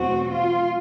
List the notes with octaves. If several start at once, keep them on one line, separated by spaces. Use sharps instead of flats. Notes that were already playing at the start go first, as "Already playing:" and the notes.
Already playing: E2 B2 F#3 A3 C4 F#4
F4